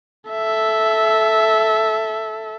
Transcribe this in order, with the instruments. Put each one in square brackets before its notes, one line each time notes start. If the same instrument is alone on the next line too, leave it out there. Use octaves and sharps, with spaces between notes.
[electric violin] A4 E5